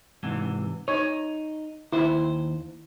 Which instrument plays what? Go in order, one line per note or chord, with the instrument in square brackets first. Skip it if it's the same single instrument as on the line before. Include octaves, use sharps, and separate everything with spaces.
[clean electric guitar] G#2 C3 E3
[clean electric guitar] D#4 [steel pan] C#5
[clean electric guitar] D#2 C5 [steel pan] E4